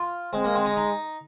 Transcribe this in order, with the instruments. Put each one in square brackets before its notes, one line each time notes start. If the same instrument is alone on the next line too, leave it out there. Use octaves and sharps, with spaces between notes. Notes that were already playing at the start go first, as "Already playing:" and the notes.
Already playing: [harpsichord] F4
[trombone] G#3 [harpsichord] C4
[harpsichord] A#3
C4
D#4
D#4